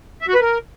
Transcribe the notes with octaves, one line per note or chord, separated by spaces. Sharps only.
E5
F#4
B4
A#4